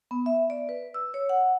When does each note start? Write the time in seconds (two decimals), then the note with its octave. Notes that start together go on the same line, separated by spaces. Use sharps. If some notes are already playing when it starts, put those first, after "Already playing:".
0.11 B3
0.26 E5
0.50 D5
0.69 B4
0.94 E6
1.14 C#5
1.29 F#5